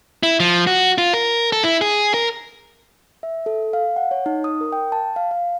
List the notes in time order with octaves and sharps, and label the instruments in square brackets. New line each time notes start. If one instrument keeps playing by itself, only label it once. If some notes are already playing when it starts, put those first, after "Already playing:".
[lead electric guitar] E4
F3
F#4
F4
A#4
A4
E4
G#4
A#4
[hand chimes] E5
A4
F5
F#5
C#5
D#4
D#6
A#4
G5
A5
F5
F5